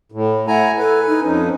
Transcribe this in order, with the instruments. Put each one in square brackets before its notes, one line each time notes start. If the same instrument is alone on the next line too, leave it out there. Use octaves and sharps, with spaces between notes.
[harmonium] A2
[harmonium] E4 G#5 A#5 [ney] F#5
[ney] A4 [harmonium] B4 G#5
[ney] D#4
[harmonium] F2 F3 D#4 [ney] C#4